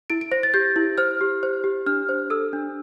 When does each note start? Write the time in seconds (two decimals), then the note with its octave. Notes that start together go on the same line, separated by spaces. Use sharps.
0.10 E4 D7
0.21 D7
0.31 C5 A#6
0.43 A6
0.54 G4 G6
0.76 E4
0.98 C5 F6
1.21 G4
1.43 C5
1.64 G4
1.86 D4 F6
2.09 C5
2.30 A4 E6
2.53 D4